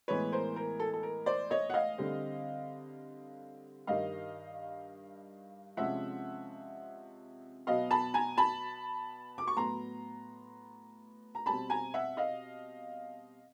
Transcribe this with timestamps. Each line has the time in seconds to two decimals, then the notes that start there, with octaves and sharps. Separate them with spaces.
0.08 A2 E3 G#3 B3 B4 C#5
0.32 A#4 C5
0.56 A#4
0.80 A4
0.94 A4
1.03 A#4
1.26 C5 D5
1.51 C#5 D#5
1.70 F#5
1.74 D#5 F5
1.98 D3 G3 C4
3.87 G2 D#3 G3 D#5 F5
5.77 C3 F3 G#3 C#4 E5 F#5
7.67 B2 F#3 B3 D#5 F5
7.91 A5 B5
8.14 G#5 A#5
8.37 A5 B5
9.38 D6
9.48 C#6
9.56 A2 F#3 B3 A#5 C6
11.35 A#5
11.46 B2 G3 C4 A5 B5
11.70 G#5 A#5
11.94 E5 F#5
12.17 D#5 F5